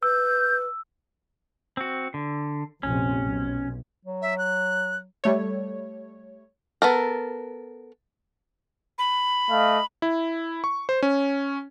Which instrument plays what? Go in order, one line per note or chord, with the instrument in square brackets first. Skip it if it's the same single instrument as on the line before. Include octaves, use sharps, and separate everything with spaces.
[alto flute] B4 [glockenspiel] E6 [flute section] F#6 G6
[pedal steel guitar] C4 F#4
D3
[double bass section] A#1 F2 C3 [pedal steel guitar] C#4
[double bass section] B1
[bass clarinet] F#3
[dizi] E5
F#6
[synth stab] G3 A3 C#5
[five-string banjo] B3 A4 A#4
[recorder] B5
[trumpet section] A3 D#5 F5
[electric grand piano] E4
C#6
C5
C#4